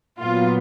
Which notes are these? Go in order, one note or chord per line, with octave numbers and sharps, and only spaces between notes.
A#2 F#3 B3 F4